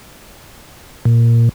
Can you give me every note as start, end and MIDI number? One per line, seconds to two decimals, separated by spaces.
1.05 1.49 46